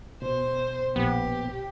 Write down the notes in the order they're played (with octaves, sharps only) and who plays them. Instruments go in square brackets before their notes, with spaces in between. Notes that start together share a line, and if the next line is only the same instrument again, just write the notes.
[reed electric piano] B2 [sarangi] C5
[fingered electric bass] A#1 [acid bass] B3 [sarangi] G4